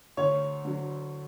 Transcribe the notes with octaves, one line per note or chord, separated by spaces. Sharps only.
D2 C#5
D3 F#3